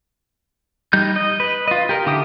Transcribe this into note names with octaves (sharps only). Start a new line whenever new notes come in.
G3 D#4 G6
D#5
B4
F4 D#5
G4 A#4
D3 E4 G4 G5 D#6